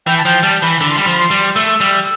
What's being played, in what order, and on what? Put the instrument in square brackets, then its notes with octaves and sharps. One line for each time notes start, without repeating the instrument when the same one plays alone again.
[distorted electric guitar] E3 [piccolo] G5
[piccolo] A5
[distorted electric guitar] F3 [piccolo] G5
[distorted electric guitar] G3 [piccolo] A5
[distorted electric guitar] E3 [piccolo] B5
[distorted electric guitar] D3 [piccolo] B5
[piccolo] C6
[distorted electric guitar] G3 [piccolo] B5
[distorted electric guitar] F3
[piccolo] B5
C6
[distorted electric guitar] G3
[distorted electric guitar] A3 [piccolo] E6
[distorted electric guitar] G3